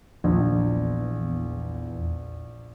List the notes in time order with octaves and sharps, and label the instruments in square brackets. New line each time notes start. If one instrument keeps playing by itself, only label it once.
[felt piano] A#1 [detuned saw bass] E2